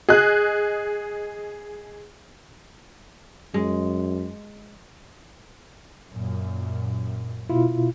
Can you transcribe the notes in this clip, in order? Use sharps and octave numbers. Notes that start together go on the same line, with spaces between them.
G#4 D#5 F#6
F#2 G#3
F#2 A#2
B2 E4 F4